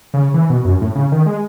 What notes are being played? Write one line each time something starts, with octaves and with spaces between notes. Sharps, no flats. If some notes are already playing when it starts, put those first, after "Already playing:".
C#3
E3
B2
F#2
A2
C#3
D#3
G#3